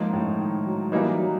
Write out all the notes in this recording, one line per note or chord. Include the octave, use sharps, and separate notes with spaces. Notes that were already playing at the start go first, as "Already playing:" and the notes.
Already playing: G#2 F3 A#3 D#4
A2
D#3
F#3
E3 F#3 G3 A#3 D#4
F#3